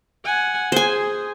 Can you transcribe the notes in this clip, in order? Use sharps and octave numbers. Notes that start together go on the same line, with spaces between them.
F#5 G#5
G#4 C5 G#5